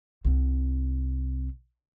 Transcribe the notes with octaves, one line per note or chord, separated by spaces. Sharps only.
C2 C4